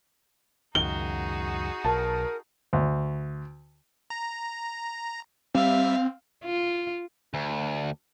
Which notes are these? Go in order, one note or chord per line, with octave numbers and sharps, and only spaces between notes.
C#2 F#2 D#3 D#4 F#4 G#4 G7
B1 A#4 A5
D2
A#5
G3 C4 E5 F5
F4
D2